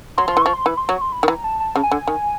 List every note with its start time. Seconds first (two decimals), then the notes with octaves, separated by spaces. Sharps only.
0.18 F#3 C6
0.28 F3 C6
0.37 E3
0.42 F3 C#6
0.53 C6
0.66 E3 B5
0.77 C6
0.89 F#3 C#6
1.01 C6
1.12 B5
1.23 D#3
1.28 E3 A#5
1.44 A5
1.60 A5
1.76 C#3
1.83 G#5
1.91 D3
2.08 D#3